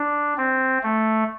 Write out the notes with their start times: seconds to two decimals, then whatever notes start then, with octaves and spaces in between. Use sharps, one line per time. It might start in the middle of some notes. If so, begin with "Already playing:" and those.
Already playing: D4
0.38 C4
0.83 A3